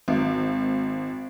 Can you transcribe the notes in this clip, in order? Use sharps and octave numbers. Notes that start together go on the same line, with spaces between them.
G#1